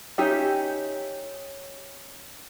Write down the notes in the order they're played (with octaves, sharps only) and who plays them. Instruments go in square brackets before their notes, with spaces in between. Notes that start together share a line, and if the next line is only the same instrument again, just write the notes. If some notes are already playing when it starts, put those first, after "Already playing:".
[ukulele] C#4 D#4 G4 E5